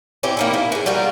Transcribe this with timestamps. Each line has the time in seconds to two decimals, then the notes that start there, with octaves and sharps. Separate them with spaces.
0.23 C4 C#4 E4 G4
0.37 A#3 D#4 E4
0.54 E4
0.72 B3 G#4
0.86 G3 F4 F#4 A#4